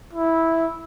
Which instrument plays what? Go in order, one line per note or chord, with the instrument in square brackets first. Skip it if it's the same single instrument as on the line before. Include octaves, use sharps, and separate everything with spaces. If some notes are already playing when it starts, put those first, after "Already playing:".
[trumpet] E4